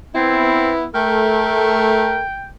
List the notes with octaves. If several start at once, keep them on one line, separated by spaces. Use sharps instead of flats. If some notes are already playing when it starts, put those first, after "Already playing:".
B3 C4 E4
A3 A#4 G5